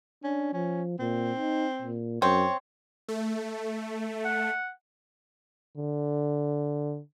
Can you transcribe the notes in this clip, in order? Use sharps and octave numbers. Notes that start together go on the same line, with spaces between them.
C#4 D4
F3 C#4
A#2 C4
D#4
A#2
F#2 C4 C#5
A3
F#5
D3